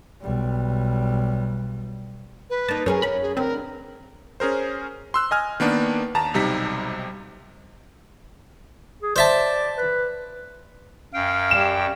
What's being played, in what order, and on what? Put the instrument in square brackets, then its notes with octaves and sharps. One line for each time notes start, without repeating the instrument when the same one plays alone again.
[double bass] B1 G3
[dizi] B4
[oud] A#3 D#4 [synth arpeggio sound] A5
[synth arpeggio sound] F#2 [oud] C#4 G#4 C#5 [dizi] A#4
[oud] F#2 C#4 [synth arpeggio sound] B5
[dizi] G#4
[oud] D2 B4 [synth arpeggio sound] C4 [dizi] A#4
[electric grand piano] C#4 G#4 A#4 C5
C6 E6 F#6
D#5 G#5 F6
D#3 A#3 B3 D4
D#2 A5 A#5
B1 C3 G3 D#4 B6
[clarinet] G#4
[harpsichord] C5 E5 A5 [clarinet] D5
[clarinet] B4
[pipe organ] F#2 G5 [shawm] F5
[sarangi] G3 [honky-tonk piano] E7